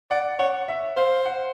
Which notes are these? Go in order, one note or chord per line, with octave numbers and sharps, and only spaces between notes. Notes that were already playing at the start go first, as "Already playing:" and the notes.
D5 F#5
C#5 F#5
E5
C5 F5
F#5